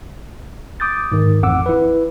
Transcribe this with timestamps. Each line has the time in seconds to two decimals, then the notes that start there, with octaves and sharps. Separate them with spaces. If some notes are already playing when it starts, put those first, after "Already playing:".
0.80 D6 D#6 G6 A6
1.12 G#2 D#3
1.43 A1 F2 F#5 D6 E6
1.66 E4 B4